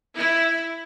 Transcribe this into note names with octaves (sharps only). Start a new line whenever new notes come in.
E4